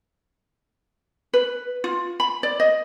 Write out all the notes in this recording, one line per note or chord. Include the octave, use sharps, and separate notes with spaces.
B4
F4
B5
D5
D#5